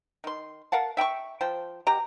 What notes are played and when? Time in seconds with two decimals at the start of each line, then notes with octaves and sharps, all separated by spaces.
0.24 D#3 C6
0.72 A#4 F5 F#5 A5
0.97 E5 G5 B5 C#6
1.41 F3 C5 G5
1.87 B2 G4 A#5